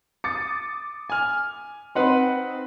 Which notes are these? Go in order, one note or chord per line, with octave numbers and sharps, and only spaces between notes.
D6 D#6 A6 C#7
G#5 F6
C4 D#4 B4 D#5 F#5 C6